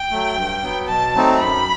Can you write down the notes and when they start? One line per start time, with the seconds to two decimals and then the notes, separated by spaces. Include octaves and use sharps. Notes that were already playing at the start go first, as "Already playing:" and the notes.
Already playing: G5
0.11 F#3 A3
0.36 G2
0.62 F#3 B3
0.88 B2 A5
1.14 F#3 A3 C4 D#4
1.40 F#2 B5